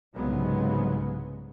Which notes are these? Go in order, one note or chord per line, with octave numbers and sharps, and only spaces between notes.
C2 G#2 C#3 F#3 G#3 B3